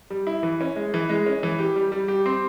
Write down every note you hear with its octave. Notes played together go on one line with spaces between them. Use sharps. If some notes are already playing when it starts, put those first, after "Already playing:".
G3
E4
E3
C#4
G#3
E3
G#3
C#4
E3
G4
G3
G3
G4
C4